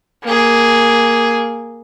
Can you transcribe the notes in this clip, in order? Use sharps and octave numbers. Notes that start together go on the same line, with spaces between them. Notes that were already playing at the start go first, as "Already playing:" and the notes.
A#3 G#4